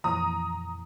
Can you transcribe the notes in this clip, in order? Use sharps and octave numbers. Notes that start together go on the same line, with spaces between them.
F2 A#2 E3 A#5 D#6